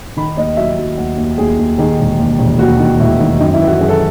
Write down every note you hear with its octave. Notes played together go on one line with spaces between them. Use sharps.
D#3 B5
D#2 D#5
F#3 E5
F#3
D#2 F#5
D#2
D#2 G#4
D#2
D#3 G#4
E1
D#2
E1
D#2 F#4
D#3
E1 E4
D#3
F#2 D#4
E4
E3
F#4
F#2 G#4
A4